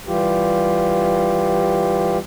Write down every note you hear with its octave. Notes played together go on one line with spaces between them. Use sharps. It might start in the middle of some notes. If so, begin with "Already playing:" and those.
E3 G3 F4 G4